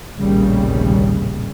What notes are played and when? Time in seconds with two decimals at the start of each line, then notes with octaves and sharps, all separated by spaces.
0.17 F1 A#1 D#2 A2 C#3 G3